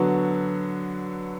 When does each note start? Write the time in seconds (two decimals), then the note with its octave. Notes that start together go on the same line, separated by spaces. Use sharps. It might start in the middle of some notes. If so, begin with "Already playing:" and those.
Already playing: D3 F#3 B3 F#4